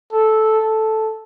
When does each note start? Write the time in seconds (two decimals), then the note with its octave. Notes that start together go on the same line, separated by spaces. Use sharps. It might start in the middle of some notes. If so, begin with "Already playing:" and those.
0.12 A4
0.63 A4